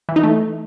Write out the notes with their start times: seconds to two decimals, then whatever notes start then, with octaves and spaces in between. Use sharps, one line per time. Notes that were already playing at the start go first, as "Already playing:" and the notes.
0.09 E3
0.16 D#4
0.23 A3